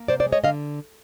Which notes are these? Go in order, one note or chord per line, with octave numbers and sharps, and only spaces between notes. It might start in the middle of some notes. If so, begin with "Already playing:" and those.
Already playing: A#3
C3 C5 D5
C5 D5
G#3
C#5 D#5
D3 D#5 F5